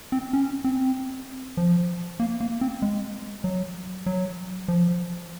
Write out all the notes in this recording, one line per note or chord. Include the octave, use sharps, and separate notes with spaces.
C4
C#4
C4
F3
A#3
A#3
C4
G#3
F#3
F#3
F3